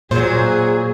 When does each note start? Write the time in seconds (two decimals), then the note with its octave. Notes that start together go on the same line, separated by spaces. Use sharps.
0.11 A#2 F#3 G#4 C5